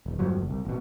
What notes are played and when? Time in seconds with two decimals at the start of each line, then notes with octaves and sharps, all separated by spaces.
0.06 D1
0.19 E2 G2 F3 F#3
0.37 F#1
0.50 C2
0.65 A1 B2